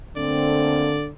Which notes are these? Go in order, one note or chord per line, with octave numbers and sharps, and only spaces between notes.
D3 A3 A#3 C4 D5